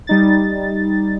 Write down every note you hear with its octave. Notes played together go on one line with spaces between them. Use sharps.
G3 D#4 A6